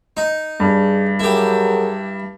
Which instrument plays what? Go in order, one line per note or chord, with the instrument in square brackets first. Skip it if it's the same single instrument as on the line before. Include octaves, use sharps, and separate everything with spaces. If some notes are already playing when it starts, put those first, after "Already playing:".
[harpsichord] D#4
[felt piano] G2 [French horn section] G#4 D5
[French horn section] F#3 G#4 A#4 [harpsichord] E4 G4